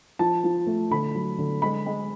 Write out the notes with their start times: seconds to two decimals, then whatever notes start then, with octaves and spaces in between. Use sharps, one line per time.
0.19 F3 A5
0.44 F3
0.67 A3
0.91 D3 B5
1.15 F#3
1.38 D3
1.62 G#3 B5
1.86 G#3